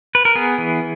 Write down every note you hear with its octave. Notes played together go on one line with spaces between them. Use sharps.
B4
A#4
B3 G#4
E3